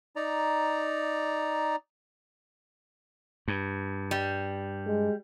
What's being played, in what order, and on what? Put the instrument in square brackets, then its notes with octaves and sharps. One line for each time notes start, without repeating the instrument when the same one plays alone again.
[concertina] D#4 D5 A#5
[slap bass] G2
[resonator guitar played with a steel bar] G3
[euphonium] G#3